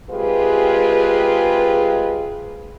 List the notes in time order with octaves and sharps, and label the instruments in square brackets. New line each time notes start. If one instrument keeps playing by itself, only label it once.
[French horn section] C3 G#3 F4 G4 G#4 B4